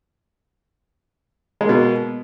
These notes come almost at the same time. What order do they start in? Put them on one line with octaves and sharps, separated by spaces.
G#3 A#3 B2